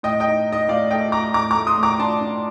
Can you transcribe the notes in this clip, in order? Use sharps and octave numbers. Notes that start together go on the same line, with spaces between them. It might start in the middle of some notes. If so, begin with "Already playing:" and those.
A2 D#5 G5
D#5 G5
D#4
D#4 D#5
A2 D5 F5
A3 D#5 G5
A3 A#5 D6
A2 A#5 D6
A3 A#5 D6
C6 D#6
A2
A#5 D6
D4 A5 C6
D4